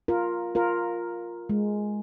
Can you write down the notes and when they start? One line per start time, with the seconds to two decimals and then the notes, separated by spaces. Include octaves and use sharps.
0.08 F4 A#4
0.55 F4 A#4
1.49 G#3